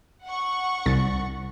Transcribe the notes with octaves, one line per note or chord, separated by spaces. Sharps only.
F#5 C#6
C2 A6